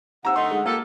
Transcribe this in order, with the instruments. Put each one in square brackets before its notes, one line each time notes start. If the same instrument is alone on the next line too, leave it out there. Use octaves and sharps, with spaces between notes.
[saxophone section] D#2 C3 [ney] F#5 [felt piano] A#5 E6
[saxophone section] D3 A3 D#4 [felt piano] C6
[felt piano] G#3
[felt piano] A#3 [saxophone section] F4 G4 A4